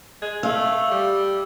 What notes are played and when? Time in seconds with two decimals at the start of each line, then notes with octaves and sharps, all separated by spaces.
0.22 G#3 G#6
0.43 A3 F5 E6
0.91 G3